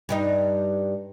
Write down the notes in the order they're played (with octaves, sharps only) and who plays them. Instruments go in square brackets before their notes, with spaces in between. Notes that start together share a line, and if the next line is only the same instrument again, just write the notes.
[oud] G2 G3 D#4